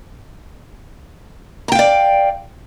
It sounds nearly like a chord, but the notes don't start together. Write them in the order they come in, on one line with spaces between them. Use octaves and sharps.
A#5 G5 F5 D5